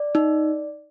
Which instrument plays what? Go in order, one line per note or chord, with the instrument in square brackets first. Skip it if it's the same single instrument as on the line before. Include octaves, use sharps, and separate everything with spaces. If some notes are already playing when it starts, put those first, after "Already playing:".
Already playing: [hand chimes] D5
D#4